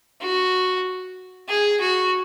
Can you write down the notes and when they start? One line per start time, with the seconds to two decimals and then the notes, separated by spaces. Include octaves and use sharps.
0.21 F#4
1.48 G#4
1.80 F#4